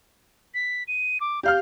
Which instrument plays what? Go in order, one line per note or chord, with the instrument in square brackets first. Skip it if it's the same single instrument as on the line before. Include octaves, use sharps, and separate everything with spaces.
[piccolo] B6
D#7
D6
[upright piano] G4 F5 F6 [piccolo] G6